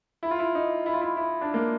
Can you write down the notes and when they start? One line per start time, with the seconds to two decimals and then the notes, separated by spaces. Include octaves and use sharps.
0.23 E4
0.31 F4
0.39 E4
0.55 D#4
0.86 E4
0.94 F4
1.01 E4
1.17 E4
1.41 D4
1.54 A#3